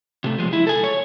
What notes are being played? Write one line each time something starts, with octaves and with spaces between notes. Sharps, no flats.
C3 A3
F3 G#3
E4
A4 G#5
C#5